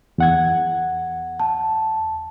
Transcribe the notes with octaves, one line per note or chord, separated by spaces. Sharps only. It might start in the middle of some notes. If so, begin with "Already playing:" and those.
E2 F#5 G#6
A5